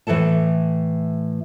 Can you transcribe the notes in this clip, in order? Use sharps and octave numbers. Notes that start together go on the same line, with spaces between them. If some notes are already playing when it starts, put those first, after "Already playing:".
A2 E3 F#3 A4 A5